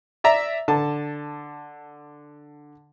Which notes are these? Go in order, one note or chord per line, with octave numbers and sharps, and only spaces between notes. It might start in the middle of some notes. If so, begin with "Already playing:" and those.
D5 E5 A#5
D3 A5